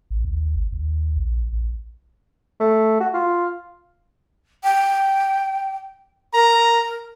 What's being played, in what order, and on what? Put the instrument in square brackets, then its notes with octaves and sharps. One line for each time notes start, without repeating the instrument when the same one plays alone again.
[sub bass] A1
D#2
G#1
D#2
A#1
A#1
[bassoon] A3
F#4
F4
[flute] G5
[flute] A#4 [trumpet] A#5